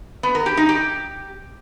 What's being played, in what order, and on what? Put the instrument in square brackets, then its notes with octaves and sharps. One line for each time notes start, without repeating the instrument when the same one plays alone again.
[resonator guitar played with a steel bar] B3
A#4
G4
D#4
G4